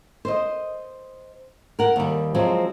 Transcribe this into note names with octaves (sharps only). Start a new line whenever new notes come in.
C5 D#5
A#4 F#5
D#2 G3
F3 F#3 G#3 C4